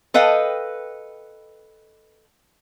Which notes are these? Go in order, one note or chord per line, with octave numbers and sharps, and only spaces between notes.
A4 B4 D#5 F5 G5